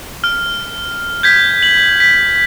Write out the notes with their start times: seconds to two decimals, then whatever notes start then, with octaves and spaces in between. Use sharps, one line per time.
0.24 F6
1.23 G6 G#6 B6
1.63 F#7
2.00 B6